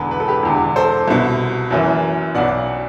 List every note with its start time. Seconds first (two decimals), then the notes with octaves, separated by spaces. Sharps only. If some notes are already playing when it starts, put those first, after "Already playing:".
Already playing: E1 E2 D3 B4
0.11 B4
0.20 A4
0.28 G4 B4
0.43 E1 E2 D3
0.76 A4 C5
1.08 C2 B2
1.71 F#1 F#2 E3
2.34 B1 B2 D5 F#5